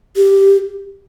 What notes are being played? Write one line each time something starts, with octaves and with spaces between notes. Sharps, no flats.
G4